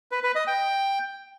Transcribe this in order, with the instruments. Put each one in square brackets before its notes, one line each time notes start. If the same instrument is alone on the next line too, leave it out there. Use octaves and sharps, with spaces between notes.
[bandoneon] B4
B4
D#5
G5